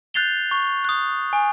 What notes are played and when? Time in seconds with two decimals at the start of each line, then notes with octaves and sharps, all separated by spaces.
0.14 F#6 G6 A6 C7 F7 G7
0.51 C#6
0.85 D#6 F#6
1.33 G#5